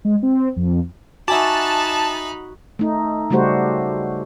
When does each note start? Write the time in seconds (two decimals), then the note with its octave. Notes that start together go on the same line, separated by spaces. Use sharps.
0.05 G#3
0.23 C4
0.56 F2
1.28 D#4 F#4 E5 G#5 A5 B5 D6
2.79 A3 D#4
3.30 C#3 G3 A3 F#4 G4 C5